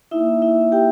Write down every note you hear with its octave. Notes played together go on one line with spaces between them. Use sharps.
A#3 D#4 E4 E5
E4 E5
G4 G5